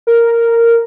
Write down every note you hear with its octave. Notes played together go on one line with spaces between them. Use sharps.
A#4